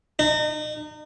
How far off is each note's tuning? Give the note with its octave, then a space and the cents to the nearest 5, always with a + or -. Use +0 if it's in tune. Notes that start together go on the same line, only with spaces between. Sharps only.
D#4 -35